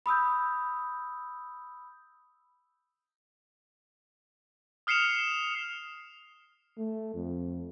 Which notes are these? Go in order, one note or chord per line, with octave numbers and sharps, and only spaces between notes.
B5 D#6 E6 G6
D#6 F6 C7 C#7 E7 F7
A3
F2